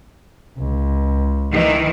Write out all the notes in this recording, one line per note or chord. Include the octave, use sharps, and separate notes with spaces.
C#2
D#3 E3